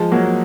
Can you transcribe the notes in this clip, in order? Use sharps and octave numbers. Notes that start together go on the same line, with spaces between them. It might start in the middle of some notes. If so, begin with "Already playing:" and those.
Already playing: F3 G#3
F#3 A#3